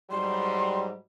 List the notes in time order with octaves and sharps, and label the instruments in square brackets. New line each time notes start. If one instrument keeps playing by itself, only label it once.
[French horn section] G#2 F#3 G3 [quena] C6